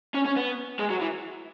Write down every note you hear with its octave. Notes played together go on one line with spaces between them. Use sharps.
C#4
C#4
B3
G#3
F#3
E3